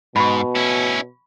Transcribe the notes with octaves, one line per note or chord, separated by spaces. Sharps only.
G#2 B2 B5 C#6
C#4 E4